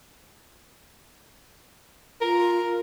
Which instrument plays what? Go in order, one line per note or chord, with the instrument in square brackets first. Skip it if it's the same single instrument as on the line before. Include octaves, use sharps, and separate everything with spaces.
[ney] F4 [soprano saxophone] A#4